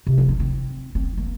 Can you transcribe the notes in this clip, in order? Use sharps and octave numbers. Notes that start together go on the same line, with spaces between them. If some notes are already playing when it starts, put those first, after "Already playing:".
C3
F3
D#4
C4
C4
A#3